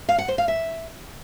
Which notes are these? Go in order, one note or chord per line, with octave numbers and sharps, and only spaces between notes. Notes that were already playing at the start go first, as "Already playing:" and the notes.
F5
F#5
C5
F5
E5